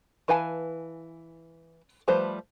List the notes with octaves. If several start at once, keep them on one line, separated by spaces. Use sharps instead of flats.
E3 B4 F5 G#5 A5
F3 G3 A3 B4 C5